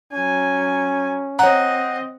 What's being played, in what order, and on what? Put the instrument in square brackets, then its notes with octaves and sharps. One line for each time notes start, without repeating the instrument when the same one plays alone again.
[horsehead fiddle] F#3 G#5 [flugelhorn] C#4
[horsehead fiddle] C4 D#5 [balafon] C#5 A#5 [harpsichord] F#5